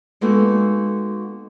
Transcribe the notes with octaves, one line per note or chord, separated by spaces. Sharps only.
G#3 A#3 B3 D#4 F#4 A4